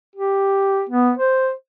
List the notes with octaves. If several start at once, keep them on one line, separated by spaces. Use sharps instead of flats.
G4
B3
C5